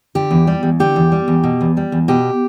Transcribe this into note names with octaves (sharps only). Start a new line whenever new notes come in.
D3 G4
E2
G3
E2
D3 G4
E2
G3
E2
B2
E2
G3
E2
B2 G4